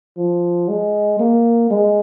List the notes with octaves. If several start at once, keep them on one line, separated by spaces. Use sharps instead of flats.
F3
G#3
A#3
G#3